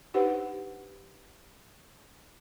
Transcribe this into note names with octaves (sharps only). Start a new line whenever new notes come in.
D4 D#4 G4 B4 C5 F#5